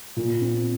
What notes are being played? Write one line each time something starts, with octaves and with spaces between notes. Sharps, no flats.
A#2
C4